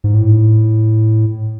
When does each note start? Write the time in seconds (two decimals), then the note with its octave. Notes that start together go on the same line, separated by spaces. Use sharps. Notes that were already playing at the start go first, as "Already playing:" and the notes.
0.04 G#2
0.14 A2